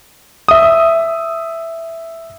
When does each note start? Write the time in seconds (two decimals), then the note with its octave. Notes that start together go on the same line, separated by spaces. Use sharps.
0.48 E5 D#6